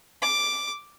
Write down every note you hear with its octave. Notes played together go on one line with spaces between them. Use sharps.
D6